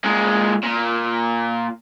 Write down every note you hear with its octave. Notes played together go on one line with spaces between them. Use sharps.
A#2 G#3
A#2